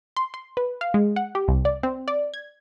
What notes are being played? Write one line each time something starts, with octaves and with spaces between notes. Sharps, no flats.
C6
C6
B4
F5
G#3
F#5
G4
C2
D5
C4
D5
G#6